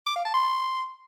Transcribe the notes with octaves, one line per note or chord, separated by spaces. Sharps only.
D6
F5
A5
C6